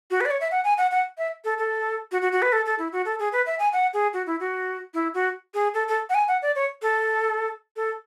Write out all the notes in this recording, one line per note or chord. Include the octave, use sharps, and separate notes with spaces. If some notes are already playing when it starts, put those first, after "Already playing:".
F#4
B4
D5
C#5
E5
F#5
G#5
F#5
F#5
E5
A4
A4
F#4
F#4
F#4
B4
A4
A4
E4
F#4
A4
G#4
B4
E5
G#5
F#5
G#4
F#4
E4
F#4
E4
F#4
G#4
A4
A4
F#5
G#5
F#5
D5
C#5
A4
A4